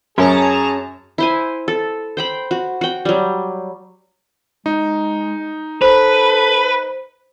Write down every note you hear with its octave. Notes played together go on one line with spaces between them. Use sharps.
F#2 C#4 G#4 A#4 C#5 A5 A#5
E4 C5 G#5
A4
C5 G5 B5
F#4
F#4 G5
F#3 G3
G#3 D#4
A4 B4 C5